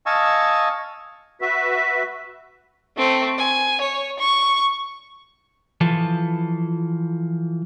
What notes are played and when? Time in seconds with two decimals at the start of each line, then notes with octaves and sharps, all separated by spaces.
0.06 D#5 F5 G#5 A5 C#6 E6
1.41 F#4 B4 E5 B6
2.98 A3 C4
3.38 G#5
3.81 C#5
4.19 C#6
5.81 E3 F3 A4